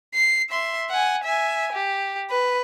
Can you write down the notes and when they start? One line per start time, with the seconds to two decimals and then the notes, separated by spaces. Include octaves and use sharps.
0.14 C7
0.50 E5 C6
0.90 F#5 G#5
1.24 E5 G#5
1.73 G4
2.30 B4